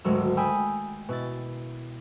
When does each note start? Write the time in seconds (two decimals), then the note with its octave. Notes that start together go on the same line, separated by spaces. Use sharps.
0.05 G#1 D2 F#3 E6
0.37 G5 G#5 B5 D#6 E6
1.09 B2 E4 A6